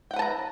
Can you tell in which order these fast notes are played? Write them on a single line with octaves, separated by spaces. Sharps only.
G5 F#5 B4 A5 A#5